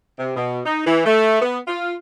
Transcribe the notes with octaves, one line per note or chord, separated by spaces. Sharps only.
C3
B2
D#4
E3
A3
B3
F4